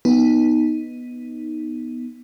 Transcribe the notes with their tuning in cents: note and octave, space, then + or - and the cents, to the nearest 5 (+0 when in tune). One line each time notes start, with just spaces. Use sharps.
B3 -5 D#4 +0